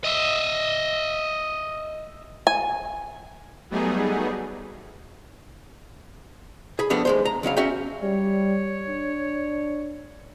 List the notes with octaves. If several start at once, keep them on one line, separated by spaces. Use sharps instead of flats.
D#5 E5
G#5
F#3 G3 A3 B3 D#4 G#4
G#4 B5
F3 G3 A3 B3 D4
D#2 G#3 C5
A#5
C#2 C#3 F#3 F5
C#4 F#4 E5 G5
G3 C#5
D4